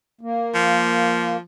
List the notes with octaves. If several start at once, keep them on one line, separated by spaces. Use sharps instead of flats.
A#3
F3